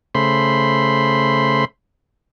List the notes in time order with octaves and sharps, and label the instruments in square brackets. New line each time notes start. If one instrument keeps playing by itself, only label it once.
[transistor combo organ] C#3 A3 C5 B5 C6